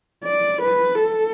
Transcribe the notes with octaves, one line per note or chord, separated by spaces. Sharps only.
D5
B4
A4